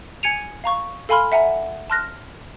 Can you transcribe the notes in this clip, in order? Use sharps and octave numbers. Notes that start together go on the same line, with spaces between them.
G#5 G#6 C#7 D#7 F7
F5 A#5 C#6
A4 F5 G#5 B5 C6 F6
E5 F#5 G#5 A#5
A5 C6 F6 F#6 A#6